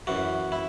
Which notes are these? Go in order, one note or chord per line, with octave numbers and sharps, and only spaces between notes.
F#2 E3 F#4
E4